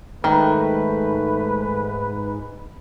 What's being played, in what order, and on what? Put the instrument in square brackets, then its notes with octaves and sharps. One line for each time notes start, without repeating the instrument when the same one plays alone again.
[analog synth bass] G#2 [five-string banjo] D#3 [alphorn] A3 [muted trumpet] B4